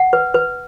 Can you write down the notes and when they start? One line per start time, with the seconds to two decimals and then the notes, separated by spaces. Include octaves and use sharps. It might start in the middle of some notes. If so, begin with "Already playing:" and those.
Already playing: F#5
0.13 B4
0.34 B4